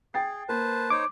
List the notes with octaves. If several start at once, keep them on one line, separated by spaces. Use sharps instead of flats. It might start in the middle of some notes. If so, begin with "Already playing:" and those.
G#4 G5 A6 C7
A#3 B4 C5 A5
D#4 C5 C#5 D6